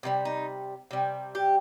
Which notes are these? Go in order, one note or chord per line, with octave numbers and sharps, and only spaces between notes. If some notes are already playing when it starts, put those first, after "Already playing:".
C3 D#3 G3
D#4
C3 G3
G4